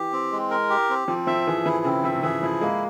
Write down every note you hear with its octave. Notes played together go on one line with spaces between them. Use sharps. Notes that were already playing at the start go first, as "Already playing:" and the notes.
Already playing: E3 G4
C4
G#3
A#4
G4
C4
F3 C4
F3 E5
E3 G#4
E3 E4
C#3 C4
F3 E5
C#3
E3 G#4
F3 E4
G#3 A#3